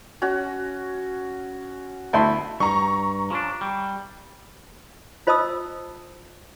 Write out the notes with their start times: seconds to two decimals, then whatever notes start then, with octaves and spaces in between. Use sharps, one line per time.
0.22 C#4 F#4
2.13 D2 E4 A5 B5 C6
2.60 G2 A#5 C#6
3.30 F3 C#4 D4
3.61 G3
5.27 F4 C5 D#5 A5 D#6 E6